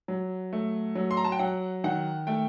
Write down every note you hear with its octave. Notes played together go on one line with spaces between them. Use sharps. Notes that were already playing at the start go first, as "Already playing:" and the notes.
F#3
A3
F#3
C6
A#5
A5
G5
F#3 F#5
D#3 F#5
A3 G5